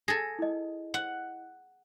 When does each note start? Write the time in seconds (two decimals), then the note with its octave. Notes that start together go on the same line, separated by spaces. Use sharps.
0.08 G#4 A4 A#6
0.39 E4 D#5
0.94 F#5